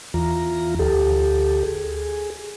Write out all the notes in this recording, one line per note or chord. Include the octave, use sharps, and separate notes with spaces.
E2 E3 F4 A#5
D2 G4 A4
G#4